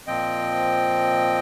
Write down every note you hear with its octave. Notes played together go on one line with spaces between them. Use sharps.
A#2 F3 C4 D#5 G5